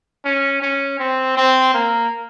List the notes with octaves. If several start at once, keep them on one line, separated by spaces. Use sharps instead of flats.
C#4
C#4
C4
C4
A#3